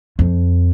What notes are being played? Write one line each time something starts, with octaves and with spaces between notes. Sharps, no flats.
F2